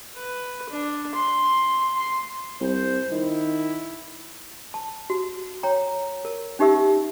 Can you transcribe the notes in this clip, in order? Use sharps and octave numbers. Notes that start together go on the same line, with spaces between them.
B4
D4
C6
C6
C2 C5
D#3 E4
A5
F#4
C#5 G5 A#5
A#4
C#4 D#4 G4 E5 E6